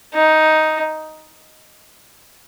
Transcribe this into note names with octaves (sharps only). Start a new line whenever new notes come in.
D#4